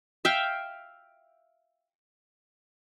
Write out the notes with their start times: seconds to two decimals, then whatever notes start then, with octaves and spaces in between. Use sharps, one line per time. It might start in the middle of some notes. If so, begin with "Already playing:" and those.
0.25 E5 F5 G5